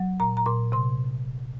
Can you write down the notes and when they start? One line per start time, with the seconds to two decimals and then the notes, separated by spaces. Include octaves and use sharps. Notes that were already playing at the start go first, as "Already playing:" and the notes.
Already playing: F#3
0.20 A#2 A#5
0.37 A#5
0.46 A#2 C6
0.72 C3 C6